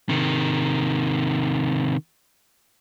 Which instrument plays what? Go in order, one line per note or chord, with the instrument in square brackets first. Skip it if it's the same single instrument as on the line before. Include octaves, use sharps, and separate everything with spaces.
[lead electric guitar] C3 D#3